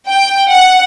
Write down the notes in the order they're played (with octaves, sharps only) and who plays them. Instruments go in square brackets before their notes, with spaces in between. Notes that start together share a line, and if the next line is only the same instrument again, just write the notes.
[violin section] G5
F#5